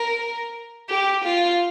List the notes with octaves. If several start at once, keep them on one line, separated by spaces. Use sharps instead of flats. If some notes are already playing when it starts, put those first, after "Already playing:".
Already playing: A#4
G4
F4